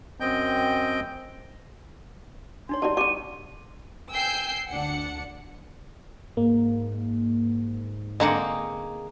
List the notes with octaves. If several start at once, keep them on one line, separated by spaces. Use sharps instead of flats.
F#2 C4 D#5 G5 G6
D4 D#4 C#5 C6
D#3 G3 E4 D5 A5
D3 G3 D#4 C#6 D6 D#7
G5 G#5 E6 G6 C7
D2 D4 F#5 C#7
G#2 A#3
D3 G#3 A#3 C4 D#4 F#5